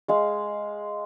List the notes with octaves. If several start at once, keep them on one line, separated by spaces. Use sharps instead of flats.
G#3 F5